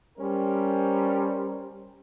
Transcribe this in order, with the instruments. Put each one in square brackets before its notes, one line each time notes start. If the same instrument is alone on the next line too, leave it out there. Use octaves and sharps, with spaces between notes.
[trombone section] G3 C#4 A#4 C5